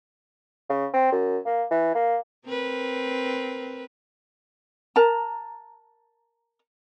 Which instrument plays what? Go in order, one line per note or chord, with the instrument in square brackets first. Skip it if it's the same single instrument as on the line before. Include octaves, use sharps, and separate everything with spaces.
[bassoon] C#3
C4
F#2
A#3
E3
A#3
[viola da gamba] C4 A#4 B4
[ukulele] A#4 A5 A#5